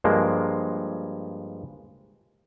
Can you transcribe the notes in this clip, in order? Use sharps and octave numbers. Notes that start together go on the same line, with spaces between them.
G2 F3 G#3 A#3